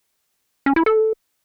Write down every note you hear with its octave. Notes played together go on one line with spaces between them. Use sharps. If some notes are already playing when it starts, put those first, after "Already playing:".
C#4
E4
A4